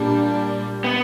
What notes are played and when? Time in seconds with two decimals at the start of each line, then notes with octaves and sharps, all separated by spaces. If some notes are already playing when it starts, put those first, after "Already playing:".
Already playing: A#2 G3 A#3 D4
0.84 B3